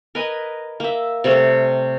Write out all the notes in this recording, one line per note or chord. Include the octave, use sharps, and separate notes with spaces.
A#4 B4 D#5 G#5
A#3 E5
C3 G3 A3